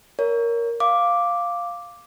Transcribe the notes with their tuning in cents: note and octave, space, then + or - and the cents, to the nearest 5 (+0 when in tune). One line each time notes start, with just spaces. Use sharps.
A#4 +0 C#5 +25
F5 +0 D6 +0